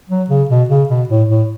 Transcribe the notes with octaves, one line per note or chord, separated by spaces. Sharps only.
F#3
C#3
B2
C#3
B2
A2
A2